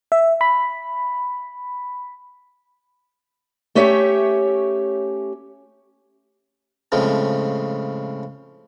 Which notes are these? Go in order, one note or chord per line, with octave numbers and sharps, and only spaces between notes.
E5
B5
A3 C#4 G4 C#5 E5
A2 C#3 F3 G#3 C4